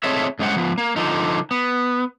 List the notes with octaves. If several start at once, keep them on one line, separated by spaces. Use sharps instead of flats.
A3 C4 G#4 C#5 D#5 E5
G2 G#3 C#4 C5 F#5
F3 B3
A#3
D3 F3 D#4
B3